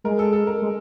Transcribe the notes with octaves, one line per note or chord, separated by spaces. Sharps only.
G#3 A#4
A4
A4
A#4
G#3